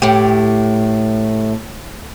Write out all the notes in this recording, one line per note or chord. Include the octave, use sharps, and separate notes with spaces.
A2 G4